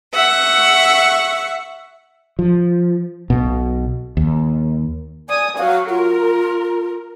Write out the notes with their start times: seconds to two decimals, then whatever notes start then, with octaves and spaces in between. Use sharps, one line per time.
0.13 E5 F#5 C#6
2.39 F3
3.30 B1 B2
4.17 D#2
5.29 D5 G#5 D#6
5.58 F#3 F#4 F5
5.89 F4 A#4